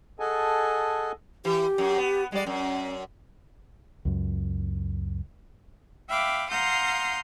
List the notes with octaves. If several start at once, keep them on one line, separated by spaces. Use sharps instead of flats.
G#4 A4 D#5 F#5 G#5 A5
E3 G4
F#2
B3
G3 G#3 D5
F#2 C#4
C#2 F#2
E5 F5 G5 B5 D6
F5 F#5 A#5 C6 D#6 G6